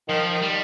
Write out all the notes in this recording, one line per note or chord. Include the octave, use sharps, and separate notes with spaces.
D#3 F3
D#3
G3